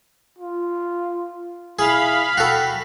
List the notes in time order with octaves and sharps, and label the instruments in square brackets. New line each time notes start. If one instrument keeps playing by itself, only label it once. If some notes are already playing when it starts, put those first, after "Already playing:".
[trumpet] F4
[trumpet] E4 [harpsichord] G#4 [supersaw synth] F5 B5
[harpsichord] F#4 A4 [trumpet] G5